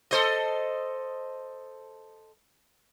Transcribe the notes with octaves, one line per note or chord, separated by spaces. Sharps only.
A4 C5 D#5